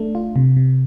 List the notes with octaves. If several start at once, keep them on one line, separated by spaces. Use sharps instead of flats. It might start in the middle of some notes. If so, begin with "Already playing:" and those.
Already playing: A3 D4
F4
C3
C3